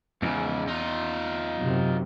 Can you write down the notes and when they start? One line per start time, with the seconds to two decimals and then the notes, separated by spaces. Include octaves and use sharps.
0.22 E2 G#2 C#3
0.68 D#4 F4
1.58 F#2 C3